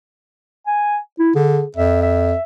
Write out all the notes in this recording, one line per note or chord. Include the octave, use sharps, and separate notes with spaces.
G#5
E4
D3 G#4
F2 E5
E5